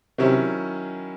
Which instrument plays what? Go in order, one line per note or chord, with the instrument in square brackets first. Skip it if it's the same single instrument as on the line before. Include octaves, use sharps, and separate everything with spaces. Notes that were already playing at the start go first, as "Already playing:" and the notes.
[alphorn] C3 [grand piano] D#3 F#3 C#4 E4